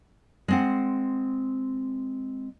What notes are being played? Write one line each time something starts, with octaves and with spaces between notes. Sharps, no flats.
G#3 C4 F#5